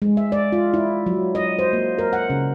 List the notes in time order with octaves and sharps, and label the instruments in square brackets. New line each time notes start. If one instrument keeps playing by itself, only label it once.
[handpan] G#3
E5
D5
F4
E4
F#3
D#5
C5
A#3
A#4
F#5
C#3